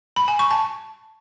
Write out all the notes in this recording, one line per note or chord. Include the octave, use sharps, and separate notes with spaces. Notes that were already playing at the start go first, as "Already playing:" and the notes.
B5
G#5
C#6
A5